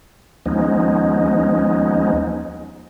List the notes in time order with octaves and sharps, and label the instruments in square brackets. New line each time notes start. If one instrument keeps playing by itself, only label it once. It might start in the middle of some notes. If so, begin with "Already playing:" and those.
[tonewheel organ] D#2 F3 G#3 B3 C#4 D#4